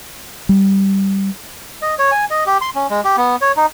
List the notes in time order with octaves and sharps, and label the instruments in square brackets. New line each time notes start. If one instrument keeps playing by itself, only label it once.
[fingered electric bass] G3
[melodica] D#5
C#5
G#5
D#5
G4
C6
C#4
G#3
G4
B3
C#5
D#4